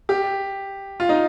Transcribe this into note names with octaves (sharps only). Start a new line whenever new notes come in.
G4
F4
D#4